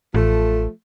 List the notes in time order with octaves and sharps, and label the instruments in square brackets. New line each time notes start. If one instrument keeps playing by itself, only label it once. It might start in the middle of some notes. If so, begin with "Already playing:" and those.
[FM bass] A1 [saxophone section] F3 A3